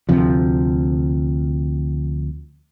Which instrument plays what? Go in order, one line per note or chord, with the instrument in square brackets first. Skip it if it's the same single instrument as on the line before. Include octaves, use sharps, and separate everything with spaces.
[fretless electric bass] D2 C3 F3